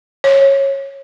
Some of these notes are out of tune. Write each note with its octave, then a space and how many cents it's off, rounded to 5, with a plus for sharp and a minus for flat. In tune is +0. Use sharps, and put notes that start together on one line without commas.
C#5 -15